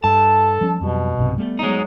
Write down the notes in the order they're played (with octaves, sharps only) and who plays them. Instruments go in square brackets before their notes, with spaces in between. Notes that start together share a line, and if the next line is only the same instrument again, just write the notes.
[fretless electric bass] G2 [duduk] A4 [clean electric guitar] A5
[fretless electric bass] F3 G3 C#4
[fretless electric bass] F2 F#3 G3 [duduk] B2
[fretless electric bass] B1 G2 C3
G3 A3 B3
[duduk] F#3 [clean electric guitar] G#3 D#4